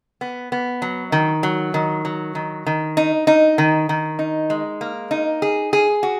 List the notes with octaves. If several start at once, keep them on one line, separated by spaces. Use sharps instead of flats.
B3
B3
F#3
D#3
F#3
D#3
F#3
D#3
D#3
D#4
D#4
D#3
D#3
D#4
G#3
A#3
D#4
G#4
G#4
F#4